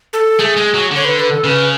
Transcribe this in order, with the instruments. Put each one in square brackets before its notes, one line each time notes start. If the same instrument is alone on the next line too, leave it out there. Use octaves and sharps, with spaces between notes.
[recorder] A4
[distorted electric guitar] A3 [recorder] G#4
[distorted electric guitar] G#3
F#3
[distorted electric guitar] D3 [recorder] C#5
[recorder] B4
B4
A4
[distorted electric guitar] C#3 [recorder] B4